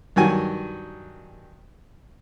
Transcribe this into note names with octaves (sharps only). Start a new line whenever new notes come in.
G2 D#3 F#3 F#4 G#5